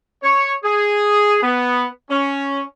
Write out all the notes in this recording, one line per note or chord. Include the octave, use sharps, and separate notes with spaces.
C#5
G#4
B3
C#4